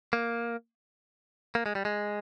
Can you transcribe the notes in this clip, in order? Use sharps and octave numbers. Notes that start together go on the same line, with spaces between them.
A#3
A#3
G#3
G3
G#3